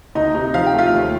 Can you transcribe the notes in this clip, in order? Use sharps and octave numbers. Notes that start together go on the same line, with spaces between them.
D2 D#4 D#5
C3 D#4 D#5
F3 F5
G5
A3
F4 F5
D#2